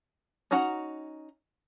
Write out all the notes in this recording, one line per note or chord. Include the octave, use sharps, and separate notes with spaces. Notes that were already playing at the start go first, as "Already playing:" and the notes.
C#4 D#4 F#4 F#5 A#5